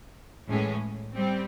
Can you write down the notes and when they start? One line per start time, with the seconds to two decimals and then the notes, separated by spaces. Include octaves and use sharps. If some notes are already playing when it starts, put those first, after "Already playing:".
0.48 A2 E3 G#3 C#4
1.16 G3 C4